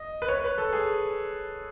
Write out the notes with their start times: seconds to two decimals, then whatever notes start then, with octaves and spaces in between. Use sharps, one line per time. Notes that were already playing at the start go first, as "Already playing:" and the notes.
Already playing: D#5
0.22 B4
0.28 C#5
0.44 B4
0.58 A4
0.73 G#4